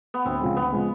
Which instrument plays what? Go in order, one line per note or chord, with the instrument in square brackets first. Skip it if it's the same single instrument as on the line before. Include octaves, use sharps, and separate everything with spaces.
[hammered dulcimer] B3
[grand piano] D2 [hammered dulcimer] C4
[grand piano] C#3 F3 G#3
[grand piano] D2 [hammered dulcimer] B3
[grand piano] C#3 F3 G#3